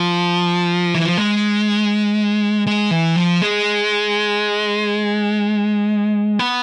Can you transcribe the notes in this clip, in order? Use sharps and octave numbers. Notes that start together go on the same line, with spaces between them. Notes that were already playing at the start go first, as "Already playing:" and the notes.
Already playing: F3
E3
F3
G#3
G#3
E3
F3
G#3
B3